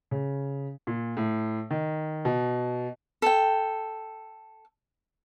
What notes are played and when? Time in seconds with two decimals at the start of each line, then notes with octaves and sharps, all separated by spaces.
0.11 C#3
0.87 A#2
1.17 A2
1.71 D#3
2.25 B2
3.22 A4 G5